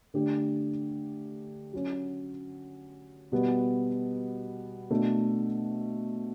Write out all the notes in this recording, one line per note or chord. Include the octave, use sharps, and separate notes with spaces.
D3 A3 D4 G4
F#3 C#4 F#4
B2 G3 B3
B2 A3 D4